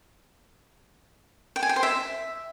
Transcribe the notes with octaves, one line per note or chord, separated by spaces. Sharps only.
G5
G#5
G5
C5
E5